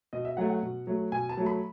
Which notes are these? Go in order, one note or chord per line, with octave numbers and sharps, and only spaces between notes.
B2 D#5
E5
F#3 A3 F#5
F#5
B2
F#3 A3
B2 G#5
A5
F#3 A3
B5